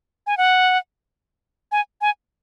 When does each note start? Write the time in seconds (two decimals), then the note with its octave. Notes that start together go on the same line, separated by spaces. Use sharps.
0.27 G#5
0.37 F#5
1.72 G#5
2.01 G#5